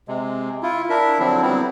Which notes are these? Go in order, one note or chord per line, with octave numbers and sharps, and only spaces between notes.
C3 G#3
E4 F4
D4 E4 A#4 E5
D3 F3 F#3 C4 D4 E4
F#3 G3 B3 C4 E4